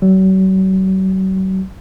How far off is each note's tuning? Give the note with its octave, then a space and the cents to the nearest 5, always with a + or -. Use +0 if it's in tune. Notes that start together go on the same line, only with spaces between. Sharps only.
F#3 +40